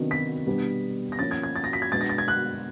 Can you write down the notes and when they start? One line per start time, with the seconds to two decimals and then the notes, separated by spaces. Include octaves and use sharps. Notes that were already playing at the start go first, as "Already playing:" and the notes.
Already playing: C3 D#3 F#3 B3 D4
0.11 B6
0.47 B2 G3 B3 D4
1.12 A#6
1.19 F3 A#3 C#4 A6
1.31 G#6
1.43 G#6
1.56 A6
1.64 A#6
1.73 B6
1.82 G#6
1.92 B2 G#3 B3 D4 A6
2.01 A#6
2.10 A6
2.18 G#6
2.28 F#6